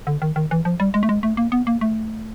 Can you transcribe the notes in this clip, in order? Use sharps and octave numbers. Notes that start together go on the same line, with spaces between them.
D3
D#3
D#3
E3
F3
G3
G#3
A3
G#3
A3
A#3
B3
A#3
A3